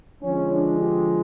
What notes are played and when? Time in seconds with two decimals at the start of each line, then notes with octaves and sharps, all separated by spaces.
0.22 D3 F3 G#3 C#4
0.51 D4
0.79 G4